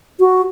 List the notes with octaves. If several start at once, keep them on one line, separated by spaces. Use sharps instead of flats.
F#4